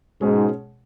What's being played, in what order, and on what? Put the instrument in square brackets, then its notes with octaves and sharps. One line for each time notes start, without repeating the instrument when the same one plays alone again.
[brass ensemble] G#2 [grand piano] B2 G#3 C#4 G#4 C#5